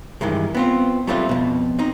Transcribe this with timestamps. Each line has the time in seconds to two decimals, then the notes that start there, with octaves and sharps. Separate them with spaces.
0.21 G2 D#3 E3 G#3
0.55 B3 C4 F4
1.07 F#3 G3 A3 C4 D4 F4
1.29 F2 B2
1.79 C4 D#4